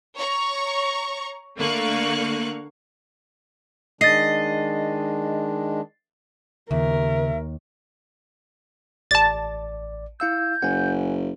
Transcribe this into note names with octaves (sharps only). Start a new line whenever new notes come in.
C#5 A#5 C#6
D3 A3 A#3 F5 C#6 F#6
D#3 G#3 D4 D#5 A6 C7
D#2 C#3 A#4 E5
A1 D5 A5 A6
E4 F5 E6 G6
F#1 F#5 G#5